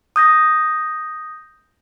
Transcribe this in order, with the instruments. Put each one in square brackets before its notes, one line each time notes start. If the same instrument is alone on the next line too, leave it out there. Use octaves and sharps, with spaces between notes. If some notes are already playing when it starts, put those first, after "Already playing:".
[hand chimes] D#6 G6 A#6